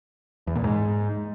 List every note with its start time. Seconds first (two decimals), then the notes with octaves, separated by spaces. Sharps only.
0.47 E2
0.56 A#2
0.64 G#2